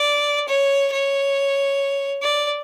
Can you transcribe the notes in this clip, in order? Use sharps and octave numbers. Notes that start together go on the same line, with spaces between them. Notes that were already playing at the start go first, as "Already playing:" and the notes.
Already playing: D5
C#5
C#5
D5